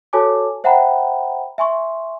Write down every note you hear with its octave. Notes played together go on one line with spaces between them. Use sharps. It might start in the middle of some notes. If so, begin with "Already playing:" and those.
F#4 A4 C#5 G#5 A5 D6
C5 E5 F#5 G5 A#5 B5
E5 G#5 C6 C#6